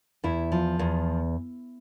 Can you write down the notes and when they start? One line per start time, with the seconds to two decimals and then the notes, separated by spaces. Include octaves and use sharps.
0.24 E2 E4
0.52 F3
0.79 E2